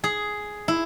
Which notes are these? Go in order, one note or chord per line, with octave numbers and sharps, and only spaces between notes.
G#4
E4